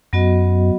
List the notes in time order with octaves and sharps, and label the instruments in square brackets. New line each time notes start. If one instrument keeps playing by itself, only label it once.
[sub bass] F#2 [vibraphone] F#3 B3 F#4 D#5